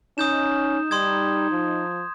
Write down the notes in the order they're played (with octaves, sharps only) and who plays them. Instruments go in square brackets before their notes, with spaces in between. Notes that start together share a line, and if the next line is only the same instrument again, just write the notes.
[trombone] C#4 [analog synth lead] D#4 [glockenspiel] D#6 G6 E7
[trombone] G3 [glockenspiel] C6 D#6 G#6
[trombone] F3